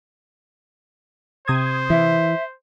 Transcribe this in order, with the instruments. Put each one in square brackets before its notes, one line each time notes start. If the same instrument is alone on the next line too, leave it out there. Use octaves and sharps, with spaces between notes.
[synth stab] C3 D#6 G#6 [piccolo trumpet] C5
[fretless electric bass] E3 [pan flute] E5